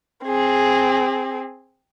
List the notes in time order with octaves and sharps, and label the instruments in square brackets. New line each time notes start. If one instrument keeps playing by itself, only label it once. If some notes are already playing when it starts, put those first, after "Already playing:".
[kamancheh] C4 G#4